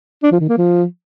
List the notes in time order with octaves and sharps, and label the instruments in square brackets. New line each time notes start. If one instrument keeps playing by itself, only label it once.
[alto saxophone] D4
F3
D#3
A#3
F3